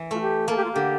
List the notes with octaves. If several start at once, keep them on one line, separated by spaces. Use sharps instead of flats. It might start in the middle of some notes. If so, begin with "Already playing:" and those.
Already playing: E3
A3 F4
G4
A#3 A4
G4
F4
D3 G4